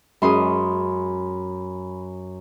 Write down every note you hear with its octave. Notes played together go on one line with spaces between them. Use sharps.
F#2 G#3 C#4 G#4 B5 C6 D#6